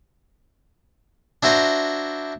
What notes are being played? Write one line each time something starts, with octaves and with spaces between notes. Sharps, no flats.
D4 E4 F#4 C5 A#5